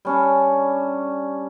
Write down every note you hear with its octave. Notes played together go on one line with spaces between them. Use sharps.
G3 C#4 D4